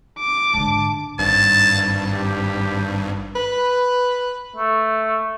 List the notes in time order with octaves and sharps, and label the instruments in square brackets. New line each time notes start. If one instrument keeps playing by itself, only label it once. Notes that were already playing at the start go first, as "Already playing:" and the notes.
[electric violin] D6
[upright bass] G#2 D3 [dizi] A5
[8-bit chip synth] G#1 G2 [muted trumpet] A5
[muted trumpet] G4
[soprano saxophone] B4
[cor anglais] A3